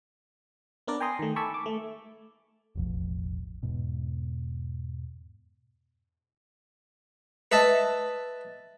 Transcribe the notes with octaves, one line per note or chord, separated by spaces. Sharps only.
B3 D4 A#4 B4 D5
G5 G#5 A#5 C6 D#6
D#3 A3
G#5 A5 B5 C#6 D6 E6
D6
A3
E1 A1 F3
E2 G#2 B2
B4 D#5 E5 A5